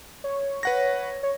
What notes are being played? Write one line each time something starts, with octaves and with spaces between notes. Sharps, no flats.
C#5
B4 F#5 A#6
C#5